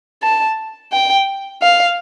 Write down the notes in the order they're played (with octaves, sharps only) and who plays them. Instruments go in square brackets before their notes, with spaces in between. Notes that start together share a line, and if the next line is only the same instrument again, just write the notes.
[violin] A5
G5
F5